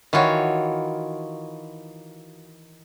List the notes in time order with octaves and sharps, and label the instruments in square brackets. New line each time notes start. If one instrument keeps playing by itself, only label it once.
[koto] D#3 E3 F4 F#4 C#5